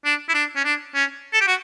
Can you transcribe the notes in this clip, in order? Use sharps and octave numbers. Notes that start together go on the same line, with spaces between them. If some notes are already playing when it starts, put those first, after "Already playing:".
D4
E4
D4
C#4
D4
C#4
A4
G4
F#4